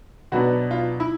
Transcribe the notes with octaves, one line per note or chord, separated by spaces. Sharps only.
B2 F#3 B3 D4 F#4
F4
E4